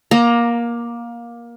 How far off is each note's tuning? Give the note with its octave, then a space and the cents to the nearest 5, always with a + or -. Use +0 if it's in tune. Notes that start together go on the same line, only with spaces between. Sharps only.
A#3 +20 A#5 +0